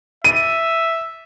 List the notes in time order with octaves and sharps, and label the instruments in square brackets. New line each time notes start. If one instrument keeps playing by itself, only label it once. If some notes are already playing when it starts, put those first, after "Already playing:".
[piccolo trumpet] E5 [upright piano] D#7